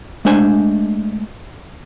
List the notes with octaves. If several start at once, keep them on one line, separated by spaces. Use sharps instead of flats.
G#3 A3 D4 C5 G#5